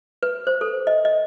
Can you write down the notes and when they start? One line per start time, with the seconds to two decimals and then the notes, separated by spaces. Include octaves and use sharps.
0.23 B4
0.47 C5
0.61 A4
0.87 D#5
1.05 D#5